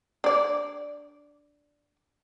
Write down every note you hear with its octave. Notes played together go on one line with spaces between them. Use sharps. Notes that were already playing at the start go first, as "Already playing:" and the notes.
D4 D5